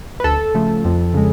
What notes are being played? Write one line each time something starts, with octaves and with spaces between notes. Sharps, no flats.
B4
D2 A4
C#3 F3 A3
F2
C#3 G#3